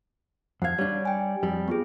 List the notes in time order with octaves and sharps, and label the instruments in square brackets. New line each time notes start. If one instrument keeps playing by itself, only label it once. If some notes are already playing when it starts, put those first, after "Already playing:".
[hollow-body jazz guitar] F2 F5 [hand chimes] F#5 G#6
[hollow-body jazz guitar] G3 D4 [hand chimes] C#5
[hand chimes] G5 G#5
[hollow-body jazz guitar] F2 G3
[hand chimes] B3 F4 G#4